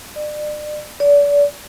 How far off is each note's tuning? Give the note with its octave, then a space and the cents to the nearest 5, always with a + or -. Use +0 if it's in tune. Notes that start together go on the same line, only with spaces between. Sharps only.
D5 +35
D5 -35